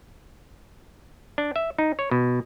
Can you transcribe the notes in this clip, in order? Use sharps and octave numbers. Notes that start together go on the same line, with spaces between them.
D4
E5
D#4
C#5
B2